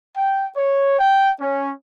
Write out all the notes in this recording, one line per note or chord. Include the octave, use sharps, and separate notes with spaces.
G5
C#5
G5
C#4